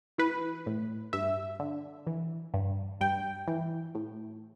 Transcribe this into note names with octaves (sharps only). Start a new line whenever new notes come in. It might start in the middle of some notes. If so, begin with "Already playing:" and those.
E3 B4
A2
G2 E5
D3
E3
G2
G2 G5
E3
A2